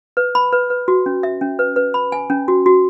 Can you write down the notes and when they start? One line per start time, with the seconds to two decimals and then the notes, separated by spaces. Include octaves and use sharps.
0.17 B4
0.35 B5
0.53 B4
0.70 B4
0.88 F#4
1.06 C#4
1.23 E5
1.41 C#4
1.59 B4
1.76 B4
1.94 B5
2.12 G#5
2.30 C#4
2.48 F#4
2.66 F#4